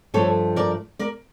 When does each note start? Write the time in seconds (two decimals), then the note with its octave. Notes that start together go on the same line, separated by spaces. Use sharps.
0.14 G2 F3 A3 A4 C#5
0.56 A#4 D5
0.99 A#4 D5